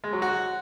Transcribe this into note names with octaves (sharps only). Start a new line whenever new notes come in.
G#3
F#3
F#4